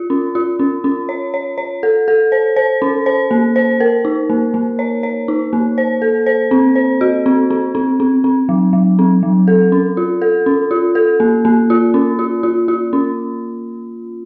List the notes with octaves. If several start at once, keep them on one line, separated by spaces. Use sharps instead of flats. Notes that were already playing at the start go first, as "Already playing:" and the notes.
Already playing: F4
C#4
F4
C#4
C#4
C#5
C#5
C#5
A4
A4
C5
C5
C#4
C5
A#3
C5
A#4
D#4
A#3
A#3
C#5
C#5
D#4
A#3
C5
A4
C5
C4
C5
F#4
C4
C4
C4
C4
C4
F#3
F#3
C4
F#3
A4
C#4
F4
A4
C#4
F4
A4
A#3
A#3
F4
C#4
F4
F4
F4
C#4